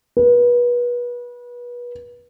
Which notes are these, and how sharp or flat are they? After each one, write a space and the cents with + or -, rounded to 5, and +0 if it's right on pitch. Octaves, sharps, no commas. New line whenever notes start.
B4 -30